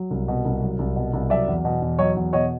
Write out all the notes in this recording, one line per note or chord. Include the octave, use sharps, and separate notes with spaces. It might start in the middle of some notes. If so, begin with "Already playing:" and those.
Already playing: F#3
C2
B2
C2
F#3
C2
B2
C2
F#3 D5 E5
E2
B2
E2
F#3 C#5 D#5
E2
B2 C#5 D#5